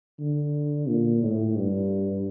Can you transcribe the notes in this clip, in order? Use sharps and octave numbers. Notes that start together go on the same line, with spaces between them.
D3
A#2
A2
G2